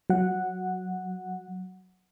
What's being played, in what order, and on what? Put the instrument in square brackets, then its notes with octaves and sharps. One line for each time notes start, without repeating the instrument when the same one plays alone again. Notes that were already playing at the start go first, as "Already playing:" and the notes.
[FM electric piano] F#3 F#5